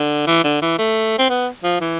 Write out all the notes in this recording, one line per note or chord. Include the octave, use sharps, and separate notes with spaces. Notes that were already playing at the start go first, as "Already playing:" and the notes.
Already playing: D3
E3
D3
E3
A3
C4
B3
F3
E3